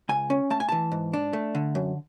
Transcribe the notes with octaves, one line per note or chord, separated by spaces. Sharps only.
C#2 G#5
C#4
A3 A5
G#5
E3 A5
G#2
D4
A3
D3
F#2